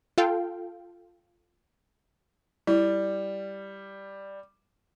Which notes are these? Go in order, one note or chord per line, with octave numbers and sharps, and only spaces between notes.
F4 A4 F5 G5
G3 E4